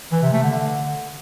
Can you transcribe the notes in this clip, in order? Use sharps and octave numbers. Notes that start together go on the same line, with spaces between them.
E3
C3
A3
D3